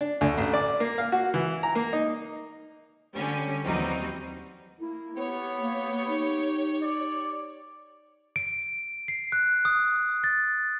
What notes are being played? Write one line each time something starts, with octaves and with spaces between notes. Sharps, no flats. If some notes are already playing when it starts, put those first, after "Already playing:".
D4
D2
A1
D5
A#3
F5
F#4
E3
A#5
A#3
D#4
D3 G3 C#4
D#2 E3 F#3 G3 C4 D#4
A#3 E4
B3 G4 C#5
A#3
D#4
D5
D7
C7
F#6
D#6
A6